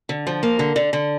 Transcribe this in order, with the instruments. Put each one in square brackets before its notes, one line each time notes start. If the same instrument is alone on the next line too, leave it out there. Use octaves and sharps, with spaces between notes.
[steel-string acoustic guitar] D3
F3
A#3
D3
D3
D3